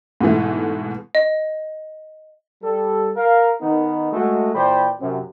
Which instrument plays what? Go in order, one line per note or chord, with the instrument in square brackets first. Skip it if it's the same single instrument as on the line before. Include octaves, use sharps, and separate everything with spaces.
[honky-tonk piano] G#2 B2 E3 A3
[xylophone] D#5
[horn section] G3 A4
A#4 F5
D#3 B3 D#4
G#3 A3 F#4
A#2 E3 C5 D5 G5 B5
F#2 C3